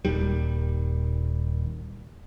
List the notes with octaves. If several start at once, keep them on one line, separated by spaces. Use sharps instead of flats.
D#1 D#2 D#3 G3